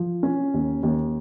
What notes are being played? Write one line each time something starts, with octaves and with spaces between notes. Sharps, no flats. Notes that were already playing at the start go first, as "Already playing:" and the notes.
Already playing: F3
C#4
D#2
D#2